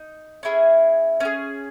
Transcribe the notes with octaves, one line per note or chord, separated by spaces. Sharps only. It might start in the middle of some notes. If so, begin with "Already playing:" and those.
Already playing: D#4
C#4 E4 G#4
C#4 E4 G#4